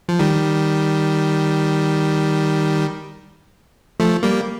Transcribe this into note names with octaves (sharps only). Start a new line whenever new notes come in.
F3
D#3 G3
F3 A3
G3 A#3